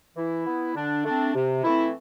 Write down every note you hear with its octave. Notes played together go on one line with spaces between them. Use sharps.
E3 E4
B3
D3 D4
A3 C4 D4
C3
E3 A3 C4 E4